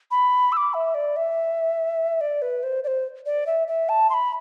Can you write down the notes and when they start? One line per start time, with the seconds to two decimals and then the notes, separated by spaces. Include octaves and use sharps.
0.11 B5
0.52 E6
0.57 D6
0.74 E5
0.95 D5
1.16 E5
2.21 D5
2.42 B4
2.63 C5
2.84 D5
2.87 C5
3.26 D5
3.47 E5
3.68 E5
3.89 A5
4.10 C6
4.14 B5